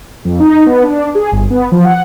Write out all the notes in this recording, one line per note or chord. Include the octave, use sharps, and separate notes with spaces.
F2
D#4
B3
D4
G#4
G1
B3
F3
F#5